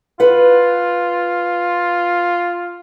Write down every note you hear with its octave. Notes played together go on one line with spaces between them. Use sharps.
F4 B4 F#5